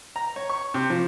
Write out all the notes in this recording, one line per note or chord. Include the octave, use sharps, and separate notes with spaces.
A#5
C#5
C#6
C3
F3